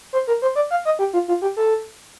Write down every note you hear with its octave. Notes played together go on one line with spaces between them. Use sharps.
C5
A#4
C5
D5
F5
D#5
G4
F4
F4
G4
A4